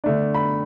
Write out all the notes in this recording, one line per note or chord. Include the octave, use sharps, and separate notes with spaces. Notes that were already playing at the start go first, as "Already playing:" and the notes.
D3 A3 D4 D5
B5